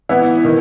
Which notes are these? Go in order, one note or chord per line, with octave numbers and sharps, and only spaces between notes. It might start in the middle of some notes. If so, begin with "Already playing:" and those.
E3 B3 E4
D#3